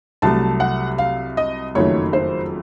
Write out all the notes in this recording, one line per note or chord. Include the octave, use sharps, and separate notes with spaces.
C2 C3 F#3 A3 A5
F#5
F5
D#5
F#1 F2 D#3 F#3 A3 C#5
C5